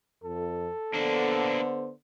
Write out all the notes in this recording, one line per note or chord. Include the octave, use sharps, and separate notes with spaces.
F2 A4
D3 A#3 B3 D4 C5